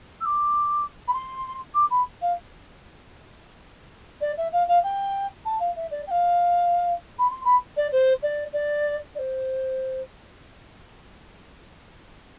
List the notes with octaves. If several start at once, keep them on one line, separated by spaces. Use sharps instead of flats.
E6
D6
B5
C6
D6
B5
F5
D5
E5
F5
F5
G5
A5
F5
E5
D5
G5
F5
B5
C6
B5
D5
C5
D5
D5
D5
C5